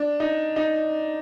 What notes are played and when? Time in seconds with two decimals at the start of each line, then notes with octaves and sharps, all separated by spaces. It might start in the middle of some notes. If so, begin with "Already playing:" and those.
Already playing: D4
0.20 D#4
0.56 D#4